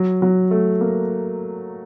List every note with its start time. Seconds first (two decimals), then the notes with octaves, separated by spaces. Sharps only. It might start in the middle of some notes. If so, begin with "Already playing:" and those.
Already playing: F#3
0.22 F#3
0.51 A3
0.81 A#3